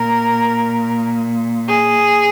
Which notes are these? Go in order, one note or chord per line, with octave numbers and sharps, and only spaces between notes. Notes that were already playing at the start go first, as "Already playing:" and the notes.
Already playing: A#2 A#4
G#4